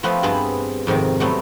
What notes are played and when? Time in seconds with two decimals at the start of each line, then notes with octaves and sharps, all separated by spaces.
0.03 F3 A3 B3 C4 F4 B4
0.23 G2 B3 C4 G#4 B4 A5
0.87 F2 G#2 C3 D#3
1.20 F#3 G3 A3 B3 C4